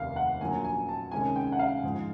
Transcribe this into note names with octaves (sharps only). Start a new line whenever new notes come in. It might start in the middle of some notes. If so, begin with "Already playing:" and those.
Already playing: F1 D#2 D#3 E5 F5
F#5
A#1 A#2 F#3 G#5
G#5
A5
C#2 C3 D#3 G#3 C#4 G#5
G5
F#5
F5
G#2 F3 G#3